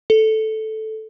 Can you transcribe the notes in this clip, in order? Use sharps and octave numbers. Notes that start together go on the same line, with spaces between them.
A4